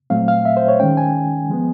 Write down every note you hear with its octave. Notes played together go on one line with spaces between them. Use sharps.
A#2 F#3 A3 C4 F5
F5
E5
C5
C#5
D#3 G#3 C#4 G5
G#5
F3 G#3 B3